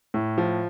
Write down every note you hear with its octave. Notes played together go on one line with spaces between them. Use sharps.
A2
F3